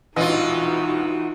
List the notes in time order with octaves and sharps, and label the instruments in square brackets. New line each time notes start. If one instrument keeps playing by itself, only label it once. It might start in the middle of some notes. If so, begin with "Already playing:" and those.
[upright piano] E1 A#1 D#5 [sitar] E3 F4 [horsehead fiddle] D#4 F#4